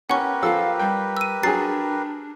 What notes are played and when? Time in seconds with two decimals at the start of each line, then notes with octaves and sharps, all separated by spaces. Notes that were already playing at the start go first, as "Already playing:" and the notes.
0.10 C#4 G4 A#4 B4 F#5 C#6
0.43 F3 A4 F5 E6
0.79 G3 G5
1.17 E6 D#7
1.43 F#3 D4 G#4 A6 C7